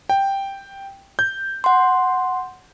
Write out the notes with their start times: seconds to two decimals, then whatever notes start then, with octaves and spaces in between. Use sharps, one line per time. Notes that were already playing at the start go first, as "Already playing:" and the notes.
0.10 G5
1.19 G6
1.64 F#5 C6